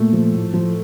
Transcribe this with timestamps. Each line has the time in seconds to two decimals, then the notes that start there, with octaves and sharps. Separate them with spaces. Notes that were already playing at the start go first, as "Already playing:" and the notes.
Already playing: A#2 A3 A4
0.13 F3
0.34 A2
0.54 F3